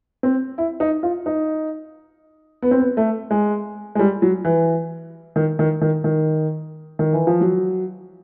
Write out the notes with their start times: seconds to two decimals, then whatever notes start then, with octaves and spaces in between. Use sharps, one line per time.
0.23 C4
0.58 E4
0.80 D#4
1.03 F4
1.26 D#4
2.62 B3
2.71 C4
2.79 B3
2.97 A3
3.31 G#3
3.95 G#3
3.99 G3
4.22 F#3
4.45 E3
5.36 D#3
5.59 D#3
5.81 D#3
6.04 D#3
6.99 D#3
7.13 E3
7.27 F3
7.41 F#3